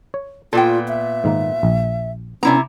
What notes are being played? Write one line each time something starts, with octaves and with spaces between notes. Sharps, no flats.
C#5
A#2 B3 F4 A4 G5
E5
G#2 D#3 A#3
A#1
C3 B3 C#4 D4 E4 A#5